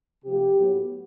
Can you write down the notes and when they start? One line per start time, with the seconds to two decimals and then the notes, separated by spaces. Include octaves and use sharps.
0.24 C3 F3 A3 G4
0.57 A2 F#3 B3